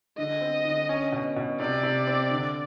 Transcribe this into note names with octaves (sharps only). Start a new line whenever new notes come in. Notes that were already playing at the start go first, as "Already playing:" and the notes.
D3 D#5
C4
D3
C#4
B2
B2
C3 D5
C3
C4
D3